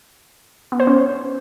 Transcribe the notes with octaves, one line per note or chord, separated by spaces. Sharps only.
B3
C5
C#4